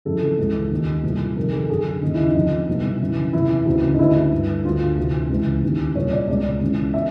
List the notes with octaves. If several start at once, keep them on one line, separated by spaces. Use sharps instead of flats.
F2 C#3 E3 A4
C#2 C#3 E3
D#2 D#3
C2 A#2
F2 C3 D#3 A#4
A4
F#2 D3 G#4
D#2 C#3 E3 D#4
E4
D#4
F2 D3
C2 B2
F#2 C#3 E3
E2 C3 E3 E4
D2 C#3 E3
D#4
D2 D3 E4
G2 D3
D2 D3 F4
D2 C3 E3
C#2 C#3 E3
D#2 C#3 E3
C2 A#2 C#5
D5
C#2 B2 D5
C#2 C#3 E3
B2 E5